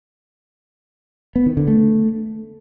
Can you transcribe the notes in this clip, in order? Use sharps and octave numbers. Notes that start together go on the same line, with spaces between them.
B3
D#3
D3
A3